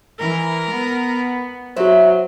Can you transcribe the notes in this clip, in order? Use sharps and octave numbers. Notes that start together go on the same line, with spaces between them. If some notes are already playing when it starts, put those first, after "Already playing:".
E3 A#4
B3
F#3 E4 F#4 B4 C5 E5